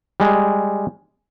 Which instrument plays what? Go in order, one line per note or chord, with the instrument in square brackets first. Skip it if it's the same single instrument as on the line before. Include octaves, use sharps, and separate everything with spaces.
[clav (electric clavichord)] G3 G#3